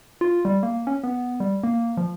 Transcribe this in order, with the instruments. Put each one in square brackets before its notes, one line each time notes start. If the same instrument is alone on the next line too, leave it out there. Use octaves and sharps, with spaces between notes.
[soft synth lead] F4
G3
A#3
C#4
B3
G3
A#3
F3